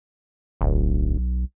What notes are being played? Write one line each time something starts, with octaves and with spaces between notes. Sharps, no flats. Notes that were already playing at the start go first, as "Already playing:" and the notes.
D1 B1